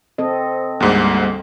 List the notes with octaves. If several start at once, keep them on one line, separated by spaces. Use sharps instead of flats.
C4 A4 D#5
D2 G#2 G3 A#3 F#6